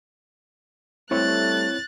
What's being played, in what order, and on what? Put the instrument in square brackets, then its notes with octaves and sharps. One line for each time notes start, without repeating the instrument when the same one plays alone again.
[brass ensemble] G3 A3 [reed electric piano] C4 E4 C#5 [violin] F#6 A6